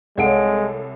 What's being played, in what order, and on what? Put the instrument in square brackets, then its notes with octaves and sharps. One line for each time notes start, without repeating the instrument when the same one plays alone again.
[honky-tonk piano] C2 A4 D7 [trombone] G#3 [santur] C#5 [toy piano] D5 F5 F#5